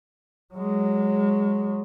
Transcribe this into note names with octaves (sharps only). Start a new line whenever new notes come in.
F#3 G#3